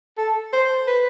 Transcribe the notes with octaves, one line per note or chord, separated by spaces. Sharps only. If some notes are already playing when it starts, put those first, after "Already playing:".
A4
C5
B4